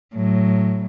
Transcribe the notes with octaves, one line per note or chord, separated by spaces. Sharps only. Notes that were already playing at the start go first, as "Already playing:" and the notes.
A2 F#3